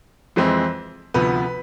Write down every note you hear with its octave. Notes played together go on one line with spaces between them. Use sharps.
F2 E3 G#3 C4
D2 C3 F3 B3 B4